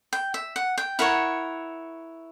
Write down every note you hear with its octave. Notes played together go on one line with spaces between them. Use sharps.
G5
E5
F#5
G5
E4 A#4 C#5 F#5